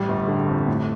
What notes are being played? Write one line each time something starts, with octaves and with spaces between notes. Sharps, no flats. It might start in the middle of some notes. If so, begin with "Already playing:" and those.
Already playing: A1 G3
G1
D3
F2
A2